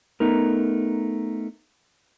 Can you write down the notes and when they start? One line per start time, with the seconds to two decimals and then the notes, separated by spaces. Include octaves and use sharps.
0.20 A3 B3 D#4 A#4